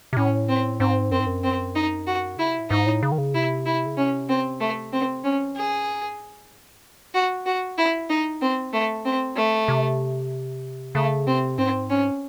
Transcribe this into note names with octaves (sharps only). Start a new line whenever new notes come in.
C3
A2 C#4
C4
G#2 C4
F#2 C4
G#2
F#2
C4
D#4
F#4
C#3 E4
C3
A2
G#2 D#4
A2
C#3
D#3
C#3
C3 E4
E4
C#3
C3 C#4
C4
A3
C4
F#3 C#4
E3
C#3 G#4
A2
G#2
A2 F#4
F#2
G#2 F#4
A2
F#2 E4
D#4
C4
A3
A2 C4
A3
C3
C#3 A3
C3 C4
G#2 C4
C#4